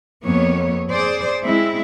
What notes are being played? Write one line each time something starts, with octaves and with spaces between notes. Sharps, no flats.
F2 A#3 B3 C#5
G#4 C5 D5
G#3 C4 E4